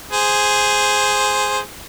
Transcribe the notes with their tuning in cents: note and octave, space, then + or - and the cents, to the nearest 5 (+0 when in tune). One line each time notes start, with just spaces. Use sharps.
G#4 +0 C5 +0